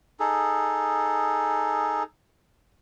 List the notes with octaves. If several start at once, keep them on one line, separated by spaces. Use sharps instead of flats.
D#4 G#4 A4